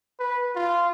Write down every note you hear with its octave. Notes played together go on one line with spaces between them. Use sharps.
B4
F4